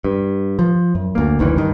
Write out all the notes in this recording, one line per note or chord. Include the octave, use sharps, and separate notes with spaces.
G2
F3
F#2
D2 A#3
F#1 D2 D#3 E3
G2 D#3